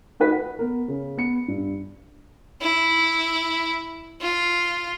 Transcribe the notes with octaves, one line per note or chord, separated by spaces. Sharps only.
D#4 F#4 B4 B6
F#5
B3 A#4
C#3
B3 C#7
G2
E4
F4